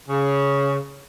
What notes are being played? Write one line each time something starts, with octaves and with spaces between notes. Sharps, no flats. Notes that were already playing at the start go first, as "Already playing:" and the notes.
C#3